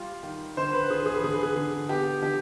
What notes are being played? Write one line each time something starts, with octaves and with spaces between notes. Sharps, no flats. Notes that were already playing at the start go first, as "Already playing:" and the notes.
Already playing: G3 F4
D#3
D3 C5
B4
D3 G#4
G#4
B4
D3 G#4
B4
G#4
D3
B3 G4
D3 G4